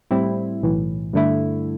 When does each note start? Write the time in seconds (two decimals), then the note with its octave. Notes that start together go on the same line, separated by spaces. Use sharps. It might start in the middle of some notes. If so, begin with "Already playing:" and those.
0.11 A2 G3 C4 E4
0.62 B1 A2 E3
1.13 G2 D3 A3 E4